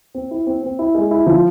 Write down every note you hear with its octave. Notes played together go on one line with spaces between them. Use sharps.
C4
E4
C4
C4
E4
G#3
E4
F3